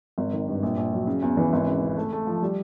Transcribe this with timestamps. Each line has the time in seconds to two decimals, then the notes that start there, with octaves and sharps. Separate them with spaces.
0.18 G#1
0.33 D#3
0.48 G2
0.63 A#1
0.77 A#1
0.93 F#3
1.07 C#3
1.22 E2
1.37 E3
1.53 G#1
1.67 C#3
1.82 C#3
1.97 A3
2.13 A3
2.27 F3
2.42 G3